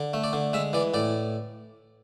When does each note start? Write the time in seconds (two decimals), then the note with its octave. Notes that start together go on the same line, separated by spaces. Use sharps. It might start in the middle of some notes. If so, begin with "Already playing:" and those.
Already playing: D3
0.14 A3
0.24 D5
0.33 D3
0.53 G#3 E5
0.73 E3 D5
0.94 A2 D5